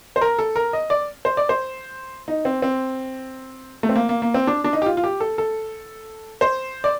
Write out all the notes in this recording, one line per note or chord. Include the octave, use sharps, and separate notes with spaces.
C5
A#4
A4
A#4
D#5
D5
C5
D5
C5
D#4
C4
C4
A3
C4
A#3
A#3
A#3
C4
D4
D4
D#4
G4
F4
F4
G4
A4
A4
C5
D5